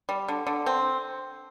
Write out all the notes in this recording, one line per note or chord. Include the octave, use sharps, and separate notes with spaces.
G3
D3
D3
C4